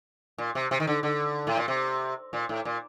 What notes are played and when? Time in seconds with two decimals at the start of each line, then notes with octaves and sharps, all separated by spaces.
0.38 A#2
0.55 C3
0.71 C3
0.80 D#3
0.87 D3
1.03 D3
1.47 A2
1.57 A#2
1.68 C3
2.33 A#2
2.49 A2
2.65 A#2